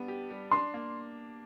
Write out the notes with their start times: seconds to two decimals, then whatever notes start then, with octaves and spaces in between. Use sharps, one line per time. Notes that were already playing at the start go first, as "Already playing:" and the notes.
Already playing: G3 B3 D4
0.08 G4
0.30 G3
0.52 D4 C6
0.74 A#3